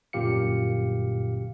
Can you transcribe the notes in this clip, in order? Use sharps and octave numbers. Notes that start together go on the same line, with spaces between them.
G1 F#2 A#2 G4 F5 C#7